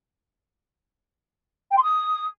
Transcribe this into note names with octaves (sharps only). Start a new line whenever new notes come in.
G5
C6
D#6